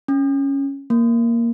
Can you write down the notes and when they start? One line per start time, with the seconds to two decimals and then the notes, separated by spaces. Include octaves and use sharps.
0.08 C#4
0.90 A#3